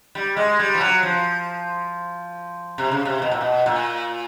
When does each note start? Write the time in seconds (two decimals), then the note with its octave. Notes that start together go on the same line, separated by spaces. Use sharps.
0.15 G3
0.36 G#3
0.59 G3
0.75 F3
0.81 F#3
1.03 F3
2.78 C3
2.91 C#3
3.05 C3
3.22 B2
3.32 A#2
3.41 B2
3.66 A#2